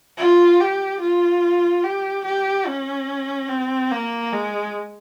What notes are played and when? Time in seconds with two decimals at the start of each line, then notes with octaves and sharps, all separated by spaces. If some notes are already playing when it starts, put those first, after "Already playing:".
0.18 F4
0.59 G4
1.01 F4
1.83 G4
2.25 G4
2.66 C#4
3.49 C4
3.91 A#3
4.32 G#3